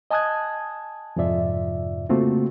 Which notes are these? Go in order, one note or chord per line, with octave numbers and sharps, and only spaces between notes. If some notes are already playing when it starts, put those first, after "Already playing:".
D#5 G#5 A5 D#6 F#6 G#6
F2 G#2 C3 F4 D5 E5
C#3 A3 A#3 C4 F4 F#4